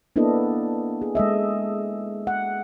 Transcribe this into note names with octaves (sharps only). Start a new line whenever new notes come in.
A#3 B3 D4 E4 A4 D#5
G#4
G#3 A4 D#5 E5
F#5